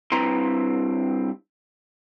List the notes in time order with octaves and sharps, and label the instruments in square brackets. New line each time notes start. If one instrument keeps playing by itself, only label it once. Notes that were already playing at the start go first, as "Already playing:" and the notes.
[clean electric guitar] G2 C4 E4 B4 A#5 C6